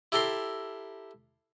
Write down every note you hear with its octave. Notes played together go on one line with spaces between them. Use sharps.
E4 G4 A4 A#4 C6